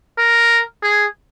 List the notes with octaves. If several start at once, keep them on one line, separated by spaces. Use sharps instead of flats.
A#4
G#4